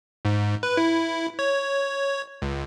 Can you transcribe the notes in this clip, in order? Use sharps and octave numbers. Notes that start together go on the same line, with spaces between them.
G#2
B4
E4
C#5
C#2